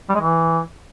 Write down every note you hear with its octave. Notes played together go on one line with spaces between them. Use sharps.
G3
G#3
E3